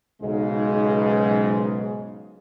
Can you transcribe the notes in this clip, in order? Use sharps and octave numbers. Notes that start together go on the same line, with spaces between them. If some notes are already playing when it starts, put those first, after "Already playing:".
B1 G#2 C#3 G#3